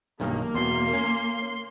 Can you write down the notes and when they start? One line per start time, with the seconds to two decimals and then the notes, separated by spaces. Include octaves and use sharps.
0.20 B1 G2 D#3 A#3
0.54 E2 B2 C6
0.93 C#4